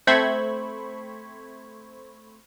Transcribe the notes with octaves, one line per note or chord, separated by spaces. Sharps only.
A3 C4 C5 B5 C#6 G#6